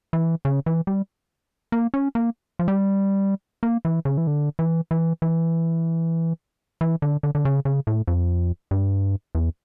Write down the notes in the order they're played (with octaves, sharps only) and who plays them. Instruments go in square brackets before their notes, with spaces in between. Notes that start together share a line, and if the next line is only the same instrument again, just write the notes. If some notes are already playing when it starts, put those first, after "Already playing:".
[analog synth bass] E3
C#3
E3
G3
A#3
C#4
A#3
F3
G3
A#3
E3
C#3
E3
D3
E3
E3
E3
E3
D3
D3
D3
C#3
C#3
A2
F2
G2
E2